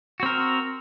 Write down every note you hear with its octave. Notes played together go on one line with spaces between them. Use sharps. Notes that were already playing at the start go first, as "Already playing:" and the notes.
C4 F#4 A#4